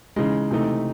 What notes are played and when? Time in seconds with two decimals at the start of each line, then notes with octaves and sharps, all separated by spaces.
0.16 C#3 E3 G#3 D#4
0.51 C3 E3 A3 D#4